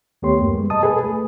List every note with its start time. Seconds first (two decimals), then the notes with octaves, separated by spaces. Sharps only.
0.22 D#2 A3 B3 G4 C#5 C6
0.39 F#2 A#3
0.54 G3 G#3
0.70 B2 D#5 A5 D#6
0.83 G#4 A4 B4 G#5
1.04 A3